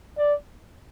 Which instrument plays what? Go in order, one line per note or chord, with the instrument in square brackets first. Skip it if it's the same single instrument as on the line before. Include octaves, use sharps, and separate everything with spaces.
[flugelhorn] D5